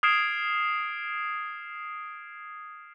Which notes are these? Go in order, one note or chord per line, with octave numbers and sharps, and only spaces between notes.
D#6 F6 G#6 C7 D7 E7